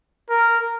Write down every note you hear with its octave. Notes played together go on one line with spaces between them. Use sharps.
A#4